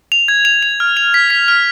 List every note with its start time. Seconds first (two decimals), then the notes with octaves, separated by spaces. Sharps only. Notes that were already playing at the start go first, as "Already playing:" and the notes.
0.12 F7
0.28 G#6
0.45 F7
0.63 F7
0.80 F6
0.97 F7
1.14 B6
1.30 B6
1.48 F6